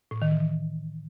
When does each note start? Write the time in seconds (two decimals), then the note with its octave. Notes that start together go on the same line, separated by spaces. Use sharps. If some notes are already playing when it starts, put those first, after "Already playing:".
0.11 A2
0.22 D#3
0.32 E3